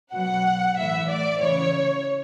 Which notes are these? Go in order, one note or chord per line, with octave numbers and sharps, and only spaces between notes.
B2 F#3 F#5
A2 E3 E5
D5
C#3 E3 C#5